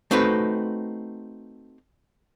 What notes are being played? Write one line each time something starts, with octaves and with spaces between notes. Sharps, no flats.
A3 C4 D#4 F#4 B4